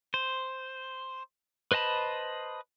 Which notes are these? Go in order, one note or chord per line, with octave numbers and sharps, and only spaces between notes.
C5
B4 C5 D#5 A5 B5